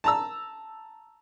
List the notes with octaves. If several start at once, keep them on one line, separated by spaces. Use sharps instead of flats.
A5 A#5 E6